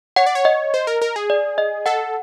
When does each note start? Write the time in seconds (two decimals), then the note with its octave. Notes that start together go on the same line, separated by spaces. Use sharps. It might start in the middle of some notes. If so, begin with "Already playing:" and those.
0.16 C#5 F#5
0.26 D5
0.35 C#5
0.45 D#5
0.74 C5
0.87 A#4
1.02 A#4
1.16 G#4
1.30 D5
1.58 D#5
1.86 A4 F#5